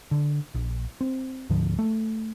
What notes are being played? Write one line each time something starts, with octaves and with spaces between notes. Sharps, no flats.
D3
A#1
C4
D2 G#2 D3 F3
A3